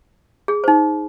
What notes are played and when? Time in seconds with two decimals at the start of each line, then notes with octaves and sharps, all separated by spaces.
0.48 G#4
0.64 D#4 C5